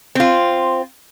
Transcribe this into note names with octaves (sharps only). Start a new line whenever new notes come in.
C4 F4